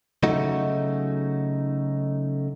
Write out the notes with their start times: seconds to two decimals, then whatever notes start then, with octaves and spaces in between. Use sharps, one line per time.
0.23 C#3 F#3 A3 D#4 F#4